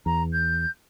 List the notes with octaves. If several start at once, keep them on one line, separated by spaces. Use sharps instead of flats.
E2 A#5
G6